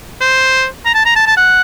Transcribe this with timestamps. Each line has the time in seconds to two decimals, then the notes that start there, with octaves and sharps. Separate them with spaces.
0.21 C5
0.86 A#5
0.95 A5
1.06 A#5
1.16 A5
1.27 A5
1.37 F#5